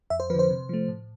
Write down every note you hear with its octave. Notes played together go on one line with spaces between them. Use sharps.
F2 E5
C5
D3 F3 B4
C5
C3
F3 A3
A2